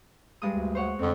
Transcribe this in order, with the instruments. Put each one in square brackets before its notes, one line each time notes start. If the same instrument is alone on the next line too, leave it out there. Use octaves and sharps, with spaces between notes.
[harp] G2 G#3 D#6
[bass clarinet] D2
[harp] C5 C#5 F#5
[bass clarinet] F2 [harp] D3 C4